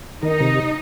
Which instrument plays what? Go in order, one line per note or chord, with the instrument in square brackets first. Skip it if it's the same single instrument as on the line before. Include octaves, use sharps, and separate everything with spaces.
[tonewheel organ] D#3 [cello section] D#4
[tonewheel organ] C3